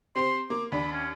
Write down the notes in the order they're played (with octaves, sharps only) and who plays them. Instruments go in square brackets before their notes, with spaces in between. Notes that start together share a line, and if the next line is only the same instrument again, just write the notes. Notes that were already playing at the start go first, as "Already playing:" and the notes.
[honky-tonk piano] C4 G4 C5 [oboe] C6
[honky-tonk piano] A#3 [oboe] D6
[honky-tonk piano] D#2 D4 D5 [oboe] B5
[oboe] C#4